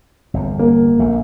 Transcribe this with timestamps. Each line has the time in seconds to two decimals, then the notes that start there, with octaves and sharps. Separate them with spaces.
0.34 G1 E2
0.59 A#3
0.99 A#1 A3